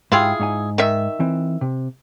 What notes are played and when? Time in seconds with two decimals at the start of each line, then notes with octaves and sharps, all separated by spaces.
0.12 G#2 E4 F4 G4 G#4 G5
0.39 G#2 D#4 G#5
0.78 D#3 E5
1.20 E3 C4
1.61 C3